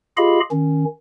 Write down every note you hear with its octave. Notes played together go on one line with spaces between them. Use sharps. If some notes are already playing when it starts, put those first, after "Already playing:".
F4 G4 G#4 D#5 F5 B5
D#3 C#4